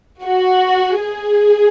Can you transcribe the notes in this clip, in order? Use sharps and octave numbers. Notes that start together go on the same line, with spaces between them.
F#4
G#4